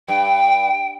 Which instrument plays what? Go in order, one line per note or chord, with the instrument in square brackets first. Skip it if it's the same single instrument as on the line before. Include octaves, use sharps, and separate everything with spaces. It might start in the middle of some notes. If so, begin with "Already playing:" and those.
[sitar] G2 [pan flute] G5